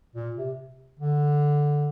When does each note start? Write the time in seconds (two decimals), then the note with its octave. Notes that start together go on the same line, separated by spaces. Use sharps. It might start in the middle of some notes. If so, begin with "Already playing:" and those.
0.15 A#2
0.36 C3
0.99 D3